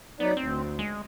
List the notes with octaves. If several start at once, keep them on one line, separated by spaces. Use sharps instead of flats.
F#3 B3 D#4 D5
D2 C4
G#3